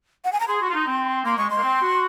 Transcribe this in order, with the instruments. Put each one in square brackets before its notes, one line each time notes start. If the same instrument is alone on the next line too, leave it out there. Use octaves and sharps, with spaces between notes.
[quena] F#5
G#5
A#5
[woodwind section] G#4 [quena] C6
[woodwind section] F#4
F4
D#4
C4
[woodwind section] A#3 [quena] C6
[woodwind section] G#3 [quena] C#6
[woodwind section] G#3 [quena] C6
[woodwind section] A#3
C4
F#4